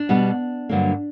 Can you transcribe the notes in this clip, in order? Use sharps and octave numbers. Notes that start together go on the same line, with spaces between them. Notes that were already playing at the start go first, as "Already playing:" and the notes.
Already playing: D4
B2 G3 B3
G2 D3 F#3 A#3